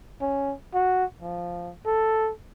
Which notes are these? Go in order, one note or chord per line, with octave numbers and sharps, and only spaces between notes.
C#4
F#4
F3
A4